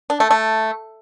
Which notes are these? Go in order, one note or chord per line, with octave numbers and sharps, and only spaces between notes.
D4
A3
A3